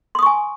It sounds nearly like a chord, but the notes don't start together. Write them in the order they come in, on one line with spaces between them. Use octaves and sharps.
C6 D#6 C#6 G#5